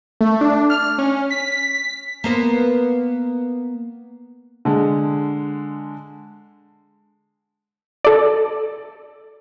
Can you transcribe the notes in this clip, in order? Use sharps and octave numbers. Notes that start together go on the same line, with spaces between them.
A3
D4
F6
C#4
B6
A#3 B3 C5
D3 G#3
A4 D5